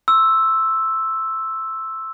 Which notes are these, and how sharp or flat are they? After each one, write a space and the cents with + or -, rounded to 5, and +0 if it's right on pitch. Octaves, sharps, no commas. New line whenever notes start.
C6 +30 E6 +0